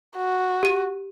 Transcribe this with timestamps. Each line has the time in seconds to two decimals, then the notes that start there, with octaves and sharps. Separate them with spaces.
0.17 F#4
0.63 G4 D#7